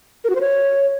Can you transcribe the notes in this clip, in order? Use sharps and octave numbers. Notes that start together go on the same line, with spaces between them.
A#4
F#4
C5
C#5